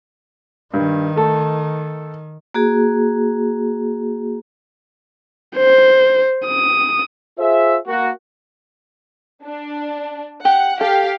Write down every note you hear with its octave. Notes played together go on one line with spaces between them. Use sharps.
G2 D#3
A3 A4
A#3 F#4 G#4
C5
D#6
F4 G#4 C5 E5
A#3 F#4
D4
G4 F#5
G4 A4 F5